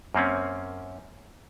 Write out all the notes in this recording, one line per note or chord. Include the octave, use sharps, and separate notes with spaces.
F#2 A#3 C4 C#4